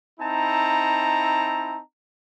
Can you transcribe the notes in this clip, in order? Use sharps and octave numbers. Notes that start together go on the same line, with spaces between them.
C4 D#4 E4 A5 A#5